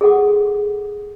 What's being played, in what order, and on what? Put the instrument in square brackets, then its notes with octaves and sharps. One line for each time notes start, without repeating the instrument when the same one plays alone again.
[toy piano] G#4 A4 F#5 D6